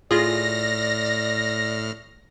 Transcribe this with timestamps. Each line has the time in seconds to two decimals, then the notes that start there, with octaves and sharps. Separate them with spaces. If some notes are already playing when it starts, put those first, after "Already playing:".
0.11 A2 F4 G#4 D5 F6 A#6